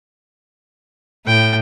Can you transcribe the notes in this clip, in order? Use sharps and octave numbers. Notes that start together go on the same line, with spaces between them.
A2 G5